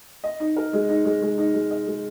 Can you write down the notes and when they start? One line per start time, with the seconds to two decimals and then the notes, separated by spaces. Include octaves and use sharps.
0.24 D#5
0.40 D#4
0.57 A#4
0.73 G#3
0.89 D#4
1.05 G#3
1.22 G#3
1.38 D#4
1.54 G#3
1.71 D#5
1.87 G#3